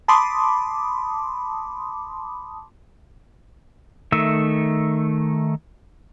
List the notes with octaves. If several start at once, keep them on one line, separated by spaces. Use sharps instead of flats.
A5 B5 C6 D6 D#6
D#3 A3 E5